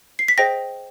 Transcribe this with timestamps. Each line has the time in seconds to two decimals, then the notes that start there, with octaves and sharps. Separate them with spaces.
0.19 C7
0.28 B6
0.38 G#4 C5 D#5 G5 A#6